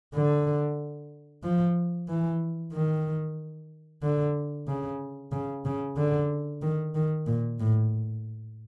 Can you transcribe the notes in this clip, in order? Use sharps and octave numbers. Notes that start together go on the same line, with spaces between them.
D3
F3
E3
D#3
D3
C#3
C#3
C#3
D3
D#3
D#3
A#2
A2